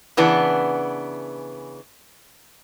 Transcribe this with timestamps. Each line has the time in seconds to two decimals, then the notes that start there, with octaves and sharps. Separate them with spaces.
0.17 C#3 E3 B3 D4